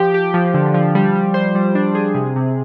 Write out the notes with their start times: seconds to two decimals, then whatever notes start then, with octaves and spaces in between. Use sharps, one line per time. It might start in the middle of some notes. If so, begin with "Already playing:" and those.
Already playing: F3 G4
0.14 G4
0.34 F3
0.54 D3
0.74 F3
0.95 G3
1.15 G3
1.34 C5
1.55 G3
1.75 D4
1.95 G#4
2.14 C3
2.36 C3